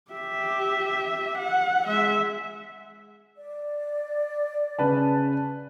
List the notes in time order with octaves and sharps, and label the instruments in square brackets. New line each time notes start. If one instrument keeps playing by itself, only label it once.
[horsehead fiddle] G4 E5
F#5
G#3 E5
[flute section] D5
[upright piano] C#3 B4 A5